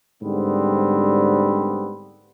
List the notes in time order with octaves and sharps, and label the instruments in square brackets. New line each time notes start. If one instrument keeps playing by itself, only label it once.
[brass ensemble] G#2 D3 G3 B3 C4